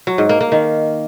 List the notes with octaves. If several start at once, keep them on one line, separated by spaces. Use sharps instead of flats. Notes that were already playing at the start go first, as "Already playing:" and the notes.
F#3
G#2
A#3
A#3
D#3